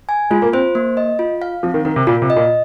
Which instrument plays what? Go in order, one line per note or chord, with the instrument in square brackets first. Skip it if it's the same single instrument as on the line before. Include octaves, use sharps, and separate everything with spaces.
[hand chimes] G#5
[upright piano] G#3 [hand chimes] F4
[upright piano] A#3
[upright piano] C4 [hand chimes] C5
[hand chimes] A#3
D#5
F4
F5
[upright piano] F3 [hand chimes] C4
[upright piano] D#3
[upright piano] D#3 [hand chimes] A#4
[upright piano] C3
[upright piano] A#2 [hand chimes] F4
[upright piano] C3
[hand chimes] D#5
[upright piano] A#2